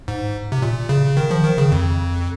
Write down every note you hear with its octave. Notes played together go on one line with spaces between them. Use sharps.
G#2
C3
A#2
C#3
D#3
F3
D#3
C#3
F2